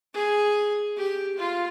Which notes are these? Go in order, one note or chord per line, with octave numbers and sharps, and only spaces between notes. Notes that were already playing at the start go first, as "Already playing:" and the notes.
G#4
G4
F4